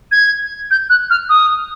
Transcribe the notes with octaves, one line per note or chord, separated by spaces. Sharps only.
G#6
G6
F#6
F6
D#6